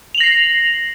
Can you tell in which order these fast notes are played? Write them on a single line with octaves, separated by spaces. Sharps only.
F7 F#7 A#6 C7